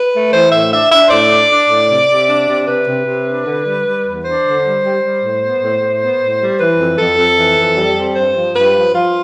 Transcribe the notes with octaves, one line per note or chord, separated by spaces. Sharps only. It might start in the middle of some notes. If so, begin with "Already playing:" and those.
Already playing: B4
A3
E3 C5
A2 E5
D4 E5
D4 E5
C5
A2 D5
D4
D4
A2
C3
C3
D4
C3
C3 B4
C3
C3
D4
D3
G3
G3
E2
D4 C5
D3
G3
G3
G3
A2
B3
A2
A2
B3
A2
G3
E3 B4
F2
F2 A4
F2
E3
F2
G3
C4
G2 C5
F3
G2 B4
F3
F3 F4